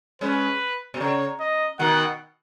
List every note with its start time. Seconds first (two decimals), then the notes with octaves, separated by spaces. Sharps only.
0.21 G#3 C#4 B4
0.94 B2
1.00 C#3 C#5
1.40 D#5
1.79 B2 D#3 F#5